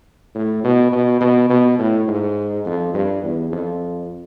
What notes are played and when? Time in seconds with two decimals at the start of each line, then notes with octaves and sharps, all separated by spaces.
0.35 A2
0.64 B2
0.92 B2
1.21 B2
1.50 B2
1.78 A2
2.08 G#2
2.65 F2
2.94 G2
3.23 E2
3.52 F2